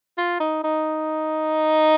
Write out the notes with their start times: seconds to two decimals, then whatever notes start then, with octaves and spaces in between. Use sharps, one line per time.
0.18 F4
0.40 D#4
0.64 D#4